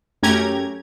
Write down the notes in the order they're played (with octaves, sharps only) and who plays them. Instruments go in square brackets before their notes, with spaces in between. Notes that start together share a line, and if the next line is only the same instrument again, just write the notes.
[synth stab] F#2 A3 C#4 G4 A#5 G#6